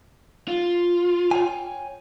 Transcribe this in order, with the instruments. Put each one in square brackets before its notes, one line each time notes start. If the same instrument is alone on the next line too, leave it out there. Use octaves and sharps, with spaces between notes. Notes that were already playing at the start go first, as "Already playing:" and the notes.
[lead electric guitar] F4
[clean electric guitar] C#5 G5 G#5